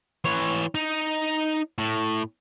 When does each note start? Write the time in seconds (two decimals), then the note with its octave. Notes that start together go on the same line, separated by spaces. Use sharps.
0.24 E3 C#5
0.75 D#4
1.78 A2